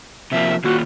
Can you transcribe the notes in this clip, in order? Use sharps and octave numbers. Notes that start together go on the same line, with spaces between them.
C3 F3 A#3 E5
D#3 A#3 F4 F#4